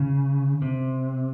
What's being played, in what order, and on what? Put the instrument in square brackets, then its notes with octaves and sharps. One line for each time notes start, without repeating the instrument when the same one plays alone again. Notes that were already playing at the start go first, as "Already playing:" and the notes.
Already playing: [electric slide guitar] C#3
C3